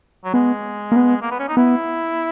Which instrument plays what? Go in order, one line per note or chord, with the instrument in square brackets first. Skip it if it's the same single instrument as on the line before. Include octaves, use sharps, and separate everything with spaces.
[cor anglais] F#3
[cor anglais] G#3 [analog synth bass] B3
[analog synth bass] A#3
B3
[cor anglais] A#3
B3
C#4
D#4
[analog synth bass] B3 [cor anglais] E4